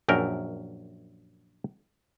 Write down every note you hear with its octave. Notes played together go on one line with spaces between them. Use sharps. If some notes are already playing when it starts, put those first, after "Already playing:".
A#1 F#2 A#4 G5